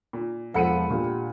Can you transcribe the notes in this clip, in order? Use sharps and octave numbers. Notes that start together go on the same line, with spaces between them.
A#2
E1 F3 A4 F#5 B5 C#7 D#7
A#2 D4 G4